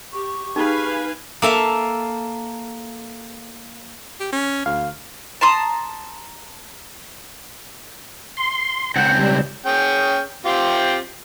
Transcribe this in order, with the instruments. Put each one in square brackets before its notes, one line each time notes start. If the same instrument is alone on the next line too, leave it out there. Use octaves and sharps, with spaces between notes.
[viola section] G4 [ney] C#6
[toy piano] D#4 [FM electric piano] G4 G#4 [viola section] B4 F5 G#5
[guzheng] A#3 A4 E5 F5
[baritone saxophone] G4
C#4
[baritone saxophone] D2 [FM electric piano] F5
[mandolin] A5 A#5 C6 D#6
[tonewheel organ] C6
[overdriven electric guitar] C#2 C4 [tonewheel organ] F#5
[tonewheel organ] G3
[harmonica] C#4 G#4 G5
C4 F4 G4